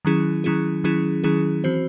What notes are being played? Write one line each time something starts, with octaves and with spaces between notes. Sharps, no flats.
D#3 F#3 C#4 E4 G#4
D#3 F#3 C#4 E4 G#4
D#3 F#3 C#4 E4 G#4
D#3 F#3 C#4 E4 G#4
E3 C4 F#4 C5